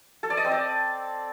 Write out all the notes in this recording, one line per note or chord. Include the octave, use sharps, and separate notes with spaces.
A4
D5
D#5
C4
D5